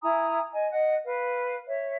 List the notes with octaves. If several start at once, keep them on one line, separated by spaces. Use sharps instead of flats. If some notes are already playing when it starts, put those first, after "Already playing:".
E4 G#5 A#5 D#6
D#5 G#5
D#5 F#5
B4 F5
C#5 E5